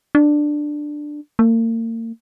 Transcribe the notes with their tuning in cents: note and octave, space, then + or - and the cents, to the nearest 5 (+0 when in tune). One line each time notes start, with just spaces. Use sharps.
D4 +10
A#3 -40